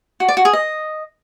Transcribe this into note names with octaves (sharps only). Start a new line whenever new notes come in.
F#4
D5
F#4
G#4
D#5